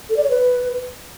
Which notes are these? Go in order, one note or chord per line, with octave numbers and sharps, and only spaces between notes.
A4
D5
C#5
B4